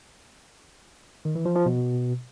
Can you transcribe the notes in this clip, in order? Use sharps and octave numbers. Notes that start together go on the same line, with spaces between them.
D#3
E3
F3
F3
B2